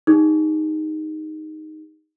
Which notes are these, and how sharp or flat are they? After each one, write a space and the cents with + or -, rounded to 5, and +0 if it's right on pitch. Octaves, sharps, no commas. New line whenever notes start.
D#4 +0 G#4 -40